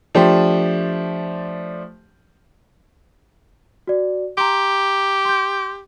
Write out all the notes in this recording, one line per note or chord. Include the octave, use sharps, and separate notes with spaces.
F3 A3 D4 G4 C5
F#4 D5
G4 A#5 C6
C6 G6